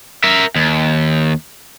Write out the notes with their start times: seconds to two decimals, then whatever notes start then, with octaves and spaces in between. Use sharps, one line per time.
0.24 A#4 E5
0.56 D#2